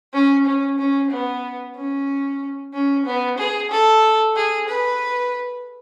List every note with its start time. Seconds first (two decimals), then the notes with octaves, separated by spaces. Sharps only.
0.14 C#4
0.46 C#4
0.78 C#4
1.11 B3
1.76 C#4
2.73 C#4
3.06 B3
3.38 G#4
3.71 A4
4.36 G#4
4.68 B4